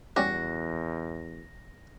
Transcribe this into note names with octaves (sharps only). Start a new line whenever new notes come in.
E2 G3 C#4 F#4 G4 A#6